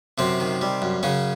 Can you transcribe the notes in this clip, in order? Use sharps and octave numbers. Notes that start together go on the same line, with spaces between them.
F#2 C3 C4
D#3
G3
F#2
F#2 C#3 C#4